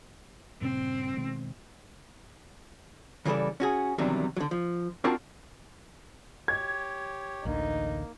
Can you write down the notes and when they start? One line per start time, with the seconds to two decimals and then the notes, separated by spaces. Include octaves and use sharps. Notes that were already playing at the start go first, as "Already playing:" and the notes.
0.61 G2 A#2 C#3 C4
1.17 B2 D#3 G#3
3.26 C#3 E3 G3 G#4 A4 D5
3.60 C#4 F#4 G#4
3.98 E2 C3 D#3 F#3 G3 D4
4.37 D3 F#3
4.51 F3
5.04 C4 D4 F4 F#4 A#4 A5
6.48 G4 C#5 G#6
7.45 A1 D2 D3 A#3 D#4